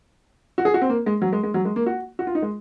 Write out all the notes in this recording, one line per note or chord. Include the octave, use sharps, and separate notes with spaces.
F#4
G#4
F#4
C4
A#3
G#3
F#3
G#3
G#3
F#3
G#3
A#3
F#4
F#4
F4
D#4
G#3